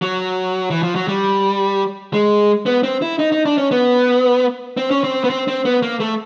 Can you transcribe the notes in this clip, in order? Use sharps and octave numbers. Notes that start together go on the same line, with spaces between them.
F#3
E3
F3
F#3
G3
G#3
B3
C4
E4
D#4
D#4
D4
C#4
B3
C4
C#4
C4
B3
C4
C4
B3
A#3
A3